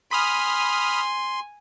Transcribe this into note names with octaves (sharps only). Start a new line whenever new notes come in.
G#5 B5 C6 D#6 F6